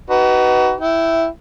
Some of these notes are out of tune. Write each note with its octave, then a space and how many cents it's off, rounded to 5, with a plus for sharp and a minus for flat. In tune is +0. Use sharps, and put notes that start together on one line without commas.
D#4 +0 F#4 +30 B4 +0
E4 +0 G5 -15